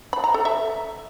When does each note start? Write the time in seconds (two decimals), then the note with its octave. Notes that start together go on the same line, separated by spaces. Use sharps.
0.13 B5
0.24 A#5
0.34 A4
0.45 E5